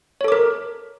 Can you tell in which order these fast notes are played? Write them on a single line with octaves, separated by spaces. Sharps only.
C#5 A4 D6 A#4